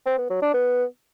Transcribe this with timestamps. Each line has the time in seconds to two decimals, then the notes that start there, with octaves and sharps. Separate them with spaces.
0.06 C4
0.18 B3
0.30 F#3
0.42 D4
0.54 B3